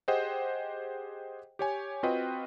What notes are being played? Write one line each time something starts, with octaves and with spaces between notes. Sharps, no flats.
G4 G#4 C5 D#5 F#5 G5
G4 C#5 G#5
C4 F4 F#4 B4 D#5 G5